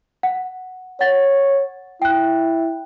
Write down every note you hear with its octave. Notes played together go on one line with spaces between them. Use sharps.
F#5
C#5 F#5 A6
E4 G5 F#6